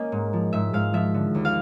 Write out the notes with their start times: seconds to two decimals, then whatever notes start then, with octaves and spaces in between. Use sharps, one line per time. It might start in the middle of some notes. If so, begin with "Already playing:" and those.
Already playing: A#3 C#4 D#5
0.12 G#2
0.33 F3
0.53 G#2 E5
0.73 G#2 F5
0.93 F3 E5
1.14 D3
1.35 D#2
1.45 F5